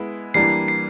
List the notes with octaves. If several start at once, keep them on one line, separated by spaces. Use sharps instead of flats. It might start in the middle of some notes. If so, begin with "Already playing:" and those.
Already playing: G#3 B3 E4
E3 G3 A#3 D4 C7
C7